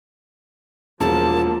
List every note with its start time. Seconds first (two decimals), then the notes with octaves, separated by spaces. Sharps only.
1.00 E1 F3 A#3 A5